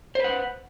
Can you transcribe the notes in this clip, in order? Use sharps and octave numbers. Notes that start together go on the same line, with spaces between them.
B4 C5 F#5